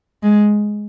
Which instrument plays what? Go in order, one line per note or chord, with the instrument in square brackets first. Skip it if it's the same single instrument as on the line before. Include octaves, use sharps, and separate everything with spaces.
[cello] G#3